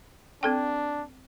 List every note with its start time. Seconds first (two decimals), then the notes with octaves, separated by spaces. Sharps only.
0.43 C4 D4 A4 G5